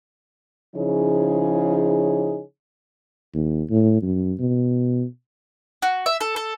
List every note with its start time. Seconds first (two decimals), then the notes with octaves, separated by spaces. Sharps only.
0.76 C#3 F3 D#4 E4 G#4 C#5
3.34 D#2
3.70 A2
4.02 F#2
4.39 B2
5.82 F#4
6.06 E5
6.21 A4
6.36 A4